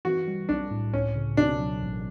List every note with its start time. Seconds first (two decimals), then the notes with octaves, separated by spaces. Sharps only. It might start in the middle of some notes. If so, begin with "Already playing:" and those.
0.05 E3 F#4
0.28 G3
0.49 B1 D4
0.71 A2
0.93 C#2 C#4
1.15 C#3
1.37 B2 D4
1.60 F#3
1.82 A1